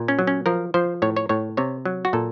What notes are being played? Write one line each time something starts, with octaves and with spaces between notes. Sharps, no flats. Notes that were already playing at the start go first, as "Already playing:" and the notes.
Already playing: A#2
C#4
F#3
C#4
F3 A#4
F3 C5
A2 C#5
C#5
A2 C#5
C3 C#5
F#3
F#4
A#2 A4